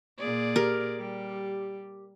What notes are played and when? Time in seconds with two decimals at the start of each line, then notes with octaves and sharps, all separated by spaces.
0.18 A#2 G#4 D5
0.56 G4 A#4
0.99 G3